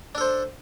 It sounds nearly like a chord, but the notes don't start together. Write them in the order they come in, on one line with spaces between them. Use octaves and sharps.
D4 A4 C5